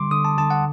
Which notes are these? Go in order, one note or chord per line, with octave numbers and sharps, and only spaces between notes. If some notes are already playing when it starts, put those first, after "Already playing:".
Already playing: D3 G3 C6 D6
D3 D#6
A5
D3 A5
F#5